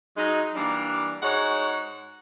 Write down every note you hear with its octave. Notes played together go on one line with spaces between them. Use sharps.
F#3 G#3 D#4
E3 G3 A#3 D4
G#2 G#3 F#4 C#5 F#5